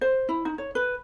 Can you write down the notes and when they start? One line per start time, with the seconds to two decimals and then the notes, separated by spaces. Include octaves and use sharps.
0.01 C5
0.29 E4
0.45 D#4
0.58 C#5
0.75 B4